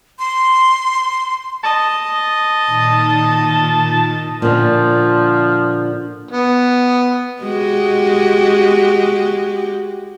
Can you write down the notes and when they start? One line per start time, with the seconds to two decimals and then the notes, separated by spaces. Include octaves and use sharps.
0.19 C6
1.63 D#5 A5
2.66 A#2 D#3
4.42 A#2 D3 F3
6.31 B3
7.42 G#3 F#4 G4